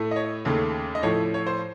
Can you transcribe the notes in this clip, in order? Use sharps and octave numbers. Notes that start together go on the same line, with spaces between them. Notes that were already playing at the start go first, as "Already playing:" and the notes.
Already playing: A2 A3
D#5
C#5
D#2 C#3 A3
D#5
A2 F3 A3 C#5
C#5
C5